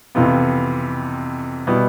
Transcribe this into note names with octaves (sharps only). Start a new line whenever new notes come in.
F2 C3 E3 B3 F4
B2 G3 B3 E4